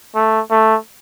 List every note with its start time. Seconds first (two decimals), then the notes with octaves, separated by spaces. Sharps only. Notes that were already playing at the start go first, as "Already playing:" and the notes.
0.15 A3
0.51 A3